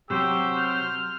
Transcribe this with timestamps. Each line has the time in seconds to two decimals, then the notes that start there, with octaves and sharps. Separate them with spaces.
0.10 C3 F#3 G4 C5 C#6 E6 G6
0.56 F6